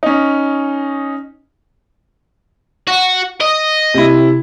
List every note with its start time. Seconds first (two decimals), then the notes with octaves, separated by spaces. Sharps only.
0.03 C#4 D#4
2.87 F#4
3.41 D#5
3.94 C3 E4